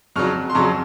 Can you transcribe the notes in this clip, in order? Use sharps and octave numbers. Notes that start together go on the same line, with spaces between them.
F2 C#3 F#3 C#6 F6
C6
F2 C#3 F#3 A#5 C#6